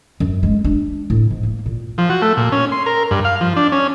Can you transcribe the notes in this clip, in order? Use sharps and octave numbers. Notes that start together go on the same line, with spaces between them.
F#2
G#3
D4
A2
G#2
A#3
A#2
F3
F#4
A3
A#2
C#4
C6
A#4
G2
F5
F3
D4
C#4